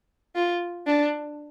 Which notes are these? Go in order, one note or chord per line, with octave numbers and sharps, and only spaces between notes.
F4
D4